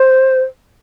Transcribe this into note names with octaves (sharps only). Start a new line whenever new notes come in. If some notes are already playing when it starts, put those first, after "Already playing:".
Already playing: C5